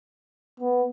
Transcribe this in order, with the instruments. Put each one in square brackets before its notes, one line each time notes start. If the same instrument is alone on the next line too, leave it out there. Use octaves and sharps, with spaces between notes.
[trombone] B3